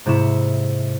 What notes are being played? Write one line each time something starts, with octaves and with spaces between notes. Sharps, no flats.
G#2 C3 E4 C#6 E7